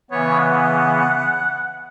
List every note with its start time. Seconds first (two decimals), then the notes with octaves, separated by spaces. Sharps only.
0.11 C#3 E3 B3 C#5
0.39 F#5